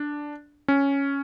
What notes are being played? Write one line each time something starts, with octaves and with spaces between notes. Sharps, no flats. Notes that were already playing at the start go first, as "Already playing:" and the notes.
Already playing: D4
C#4